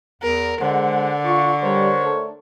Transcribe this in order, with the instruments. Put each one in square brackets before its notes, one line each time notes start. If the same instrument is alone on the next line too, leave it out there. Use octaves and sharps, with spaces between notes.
[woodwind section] E2 [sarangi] A#4
[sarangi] D3 [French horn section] G#3 [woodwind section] C5 F#5
[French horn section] F4 [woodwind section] C#6
[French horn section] G3 [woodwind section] A#4 C5 C#5
[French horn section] A3 D4 A4